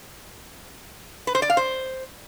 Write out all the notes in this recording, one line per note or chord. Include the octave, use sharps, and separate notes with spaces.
B4
C5
D5
F5
C5